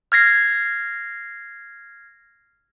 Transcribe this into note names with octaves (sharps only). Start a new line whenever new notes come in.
F6 G#6 A#6 C7